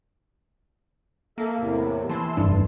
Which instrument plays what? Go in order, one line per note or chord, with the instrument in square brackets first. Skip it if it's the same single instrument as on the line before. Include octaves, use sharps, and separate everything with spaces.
[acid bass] A#3 [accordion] A4 E5
[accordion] E2 A2 C3
[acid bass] E3 [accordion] A5 C6 E6
[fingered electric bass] F1 G2 D4